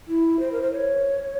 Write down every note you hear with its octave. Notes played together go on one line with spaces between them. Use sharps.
E4
C5
A#4
C5
C#5